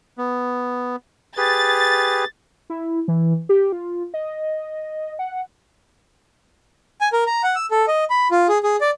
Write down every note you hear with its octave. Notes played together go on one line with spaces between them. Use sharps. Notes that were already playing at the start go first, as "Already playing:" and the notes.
B3
G4 G#4 B4 A6
E4
E3
G4
F4
D#5
F#5
G#5
A#4
A#5
F#5
E6
A4
D#5
B5
F4
G#4
G#4
D5